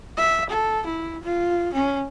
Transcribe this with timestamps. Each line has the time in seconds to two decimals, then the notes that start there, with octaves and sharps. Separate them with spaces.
0.17 E5
0.49 A4
0.86 E4
1.23 F4
1.73 C#4